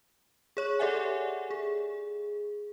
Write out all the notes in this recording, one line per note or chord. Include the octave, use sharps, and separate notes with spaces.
G#4 C#5 C#6
G4 A4 D5 E5 F#5 G#5
G#4